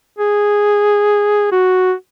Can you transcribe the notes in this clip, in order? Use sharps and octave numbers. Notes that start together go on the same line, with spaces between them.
G#4
F#4